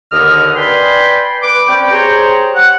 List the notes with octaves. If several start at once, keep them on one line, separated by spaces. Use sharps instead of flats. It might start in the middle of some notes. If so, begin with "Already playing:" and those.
D#2 B2 D3 D#5 F6
B4 D5 G5 G#5 B5 C6
B4 D6
C4 C#4 D5 G5
G4 G#4 C5 C#5 A#5
F#5